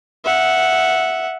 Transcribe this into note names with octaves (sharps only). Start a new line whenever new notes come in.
E5 F#5